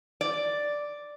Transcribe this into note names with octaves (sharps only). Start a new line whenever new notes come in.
D5